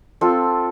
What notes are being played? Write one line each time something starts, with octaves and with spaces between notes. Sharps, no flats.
C4 F4 A4